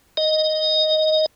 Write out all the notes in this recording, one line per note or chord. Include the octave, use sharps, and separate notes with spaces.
D#5